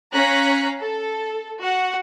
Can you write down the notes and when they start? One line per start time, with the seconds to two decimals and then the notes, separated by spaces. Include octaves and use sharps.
0.12 C#4 F5 A#5 F#6 B6 C#7
0.79 A4
1.60 F#4 F#5